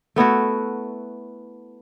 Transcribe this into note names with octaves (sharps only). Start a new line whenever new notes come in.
A3 B3 E4 F#4